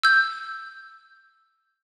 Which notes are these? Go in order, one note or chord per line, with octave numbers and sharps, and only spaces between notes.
E6 G6